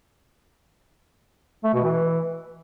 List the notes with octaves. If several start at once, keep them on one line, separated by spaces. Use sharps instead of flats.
A3
B2
E3